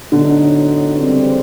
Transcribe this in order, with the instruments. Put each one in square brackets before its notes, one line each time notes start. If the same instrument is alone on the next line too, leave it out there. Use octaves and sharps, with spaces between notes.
[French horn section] A2 F#3 B3 D#4 [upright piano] D3
[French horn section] C#3 E3 G3 C4